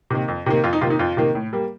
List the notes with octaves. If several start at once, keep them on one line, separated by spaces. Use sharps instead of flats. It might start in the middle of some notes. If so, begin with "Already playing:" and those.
C3 D#3 A#3
F2
C3 D#3 A#3
F2 F4
D#4
C3 D#3 A#3 F4
D#4
F2 F4
C3 D#3 A#3
A2
G3 A#3